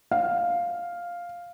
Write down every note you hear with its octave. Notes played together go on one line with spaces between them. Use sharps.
F5